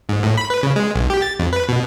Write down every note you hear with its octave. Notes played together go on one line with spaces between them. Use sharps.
G#2
A2
B5
B4
C#3
G#3
B1
G4
A6
F2
B4
B2